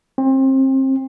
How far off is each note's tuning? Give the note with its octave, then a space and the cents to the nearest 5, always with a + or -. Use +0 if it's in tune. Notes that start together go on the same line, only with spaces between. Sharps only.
C4 +30